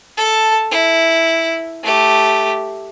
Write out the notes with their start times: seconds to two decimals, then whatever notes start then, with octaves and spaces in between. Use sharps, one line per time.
0.17 A4 A5
0.71 E4
1.83 A3 G4